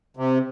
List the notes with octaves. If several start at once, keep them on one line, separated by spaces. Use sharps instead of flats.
C3